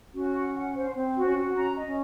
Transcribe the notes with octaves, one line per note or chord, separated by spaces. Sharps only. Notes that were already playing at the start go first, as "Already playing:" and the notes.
C#4 F#4
F#5
F#5
C5
C4 C5
F#4
C#4
F#4
C#4 A#5
D#5
C#4